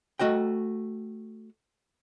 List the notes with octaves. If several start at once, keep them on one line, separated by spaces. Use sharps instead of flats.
A3 F#4 D#5 G5